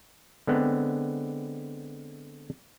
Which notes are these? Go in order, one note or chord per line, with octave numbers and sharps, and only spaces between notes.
D3 G#3 B3 C4